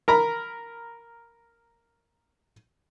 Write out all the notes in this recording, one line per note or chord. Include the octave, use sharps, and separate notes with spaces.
A#4 A#5 B5